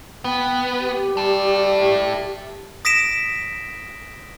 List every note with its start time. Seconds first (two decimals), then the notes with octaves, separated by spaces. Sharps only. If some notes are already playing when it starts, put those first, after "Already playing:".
0.25 B3 G5
0.80 G4
1.17 G3 E4 A4
2.85 D#6 A#6 B6 D7 E7